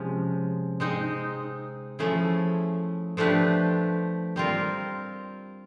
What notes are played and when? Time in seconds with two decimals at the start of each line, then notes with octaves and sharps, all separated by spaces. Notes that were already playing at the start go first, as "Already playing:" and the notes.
Already playing: C3 F3 G#3 C#4
0.80 G#3 C4 D#4
1.99 F3 A3 C#4 E4 G#4
3.17 F3 A3 D4 G4 B4
4.36 G3 C4 F4 A#4